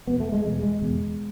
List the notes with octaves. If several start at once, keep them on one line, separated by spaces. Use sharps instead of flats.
E2 B2 B3
A3
G#3
E2 B2 G#3
G#3
E2 B2